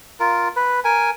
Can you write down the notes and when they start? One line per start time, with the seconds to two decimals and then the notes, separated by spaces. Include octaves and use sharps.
0.20 F4 A#4
0.56 B4
0.84 A#4 G#5